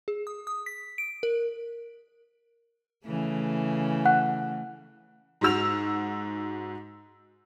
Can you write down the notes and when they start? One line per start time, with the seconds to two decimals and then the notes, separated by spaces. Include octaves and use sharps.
0.08 G#4
0.27 D#6
0.47 D#6
0.66 B6
0.98 D7
1.23 A#4
3.05 C#3 E3 A3
4.05 F#5 F#6
5.41 G#2 F#4 E6 F7